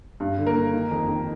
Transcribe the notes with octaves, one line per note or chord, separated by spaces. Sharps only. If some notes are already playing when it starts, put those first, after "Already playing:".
G2
D3
A#3 A#4
D3
D#3
F2
D#3